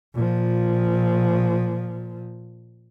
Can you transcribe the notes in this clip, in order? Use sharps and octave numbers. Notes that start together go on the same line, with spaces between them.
A#2 F3